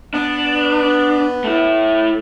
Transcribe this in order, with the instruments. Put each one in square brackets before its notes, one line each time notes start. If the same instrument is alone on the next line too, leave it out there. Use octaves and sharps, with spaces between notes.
[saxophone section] B3 [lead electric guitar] D4
[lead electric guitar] A3 E4